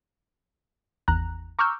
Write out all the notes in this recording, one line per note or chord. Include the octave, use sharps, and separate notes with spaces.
G#1 E2 A#5 F#6
A#5 C#6 D6 E6 F6 G6